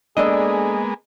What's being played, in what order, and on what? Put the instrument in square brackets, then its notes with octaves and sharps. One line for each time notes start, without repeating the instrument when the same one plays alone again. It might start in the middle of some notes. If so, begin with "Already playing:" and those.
[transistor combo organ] G#3 A#3 B3 [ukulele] D4 A4 D5 [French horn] G#4 [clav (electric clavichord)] D#5